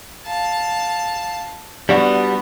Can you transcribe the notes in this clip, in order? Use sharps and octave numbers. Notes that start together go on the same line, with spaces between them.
F5 A5
G3 B3 D4 F#4